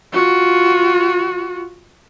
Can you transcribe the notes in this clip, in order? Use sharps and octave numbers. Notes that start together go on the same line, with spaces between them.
F4 F#4